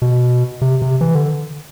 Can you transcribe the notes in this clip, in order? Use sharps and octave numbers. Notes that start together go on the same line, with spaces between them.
B2
C3
C3
E3
D3